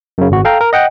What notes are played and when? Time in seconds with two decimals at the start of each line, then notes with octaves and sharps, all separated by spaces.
0.18 F#2 C#3
0.31 G#1 F#4
0.45 A4 F5 G5 A#5
0.61 A#4
0.73 D#5 F#5 G5